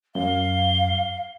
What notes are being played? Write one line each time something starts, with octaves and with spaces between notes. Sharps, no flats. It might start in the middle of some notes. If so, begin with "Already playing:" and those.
F#2 F5 G7